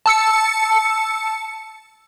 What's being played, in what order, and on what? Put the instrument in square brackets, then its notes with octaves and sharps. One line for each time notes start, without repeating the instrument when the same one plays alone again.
[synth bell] A5 E6 C#7